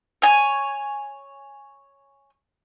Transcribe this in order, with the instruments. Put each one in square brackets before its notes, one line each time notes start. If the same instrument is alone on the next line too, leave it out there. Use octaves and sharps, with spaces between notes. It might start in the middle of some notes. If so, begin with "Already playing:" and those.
[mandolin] C#5 G#5